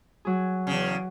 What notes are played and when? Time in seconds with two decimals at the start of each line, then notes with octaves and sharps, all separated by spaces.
0.25 F#3 G#4
0.67 E2 C#3